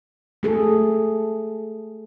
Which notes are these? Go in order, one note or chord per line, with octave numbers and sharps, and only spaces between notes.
A3 G#4 A4